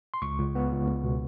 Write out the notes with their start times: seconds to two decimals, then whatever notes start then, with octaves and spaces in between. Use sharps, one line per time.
0.14 C6
0.22 C#2 C#6
0.39 C#2
0.55 B3
0.72 C#2
0.88 C#2
1.04 B2